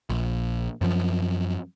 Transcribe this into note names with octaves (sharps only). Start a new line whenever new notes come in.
A#1
F#2 F3